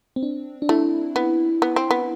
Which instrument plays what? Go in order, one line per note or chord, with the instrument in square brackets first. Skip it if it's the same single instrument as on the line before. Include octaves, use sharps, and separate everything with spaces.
[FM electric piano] C4
D4
D4
[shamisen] A3 [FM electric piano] E4
[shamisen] B3
B3
C4
B3